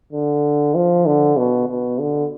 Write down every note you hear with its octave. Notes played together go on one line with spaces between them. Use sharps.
D3
F3
D3
B2
B2
D3